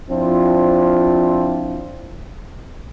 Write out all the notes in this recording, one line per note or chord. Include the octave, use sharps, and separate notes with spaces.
F3 C4 D4 E4 F4